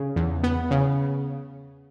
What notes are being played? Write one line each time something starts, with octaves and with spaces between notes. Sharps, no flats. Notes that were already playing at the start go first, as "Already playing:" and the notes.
Already playing: C#3
E2
B3
C#3